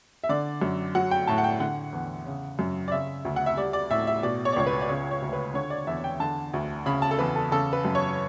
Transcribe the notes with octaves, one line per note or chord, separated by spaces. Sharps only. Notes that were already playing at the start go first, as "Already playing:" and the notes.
E5
D3 D5
F#2
F#3 F#5
G5
A2 A5
F#5
G5
D3 F#5
E2
C#3
F#2
D5
C#3 E5
D2
F#5
E5
G3 D5
D5
A2 E5
E5
B2 D5
C#5
D5
C#2 C#5
B4
D5
C#3 C#5
C#5
D2
B4
D3 C#5
D5
E2 E5
G5
D3 A5
D2
C#3 B5
A5
A4
E2 B4
A4
C#3 A4
B4
F#2
C#5